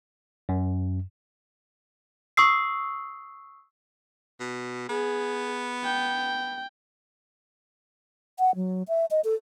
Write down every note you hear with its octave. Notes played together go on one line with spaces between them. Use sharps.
F#2
C#6 D#6 E6 C7
B2
B3 G#4
G5
F#5
F#3
E5
D#5
A4